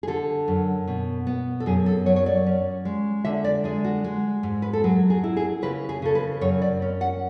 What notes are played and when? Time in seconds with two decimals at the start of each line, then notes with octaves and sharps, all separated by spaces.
0.03 G#4
0.08 D3 A4
0.48 F#2
0.88 B2
1.27 B3
1.60 A4
1.66 F#2 G#4
1.86 A4
2.06 F#3 C#5
2.16 C#5
2.26 D5
2.46 C#4
2.85 G#3
3.25 D3 E5
3.44 D5
3.64 G#3 G#4
3.84 F#4
4.04 G#3
4.43 G#2
4.62 B4
4.73 A4
4.84 F#3 G#4
5.10 G#4
5.24 E4
5.37 G#4
5.62 C#3 B4
5.89 G#4
6.02 C#3 A4
6.15 B4
6.41 F#2 C#5
6.62 D5
6.82 C#4
7.01 F#5